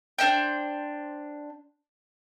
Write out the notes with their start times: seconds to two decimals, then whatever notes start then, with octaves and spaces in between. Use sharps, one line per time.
0.18 D4 C5 D#5 G5